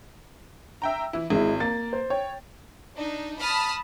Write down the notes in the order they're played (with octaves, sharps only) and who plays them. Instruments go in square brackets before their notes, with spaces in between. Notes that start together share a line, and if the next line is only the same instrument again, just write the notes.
[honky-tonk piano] E5 G5 A#5
E3 E4
[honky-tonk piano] G#1 [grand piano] G#3 E4
[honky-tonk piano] A#3 [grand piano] A6
[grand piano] C5
[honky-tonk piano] C#5 [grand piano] G5
[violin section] D4 D#4
A5 B5 D#6 F6